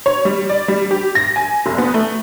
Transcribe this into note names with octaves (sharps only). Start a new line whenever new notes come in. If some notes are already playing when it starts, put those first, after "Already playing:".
C#5
G3
D5
G3
G4
A#6
G#5
F1
B3
A3